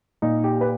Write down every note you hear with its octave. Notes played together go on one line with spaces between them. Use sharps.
A#2 D#4
G4
B4